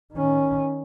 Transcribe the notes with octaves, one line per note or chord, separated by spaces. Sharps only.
D#3 C#4